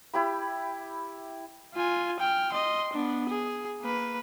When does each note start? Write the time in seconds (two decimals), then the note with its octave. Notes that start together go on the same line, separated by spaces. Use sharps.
0.14 E4 G4 B5
1.74 F4 G#5
2.20 G5 F6
2.52 D#5 C6
2.93 B3 D4
3.29 G#4
3.82 A#3 B4